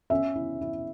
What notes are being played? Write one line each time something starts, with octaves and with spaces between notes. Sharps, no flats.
C#4 E5
E4
E4